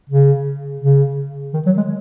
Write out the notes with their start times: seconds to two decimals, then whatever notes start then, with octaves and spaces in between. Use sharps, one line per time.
0.10 C#3
0.81 C#3
1.54 D#3
1.66 F#3
1.77 G#3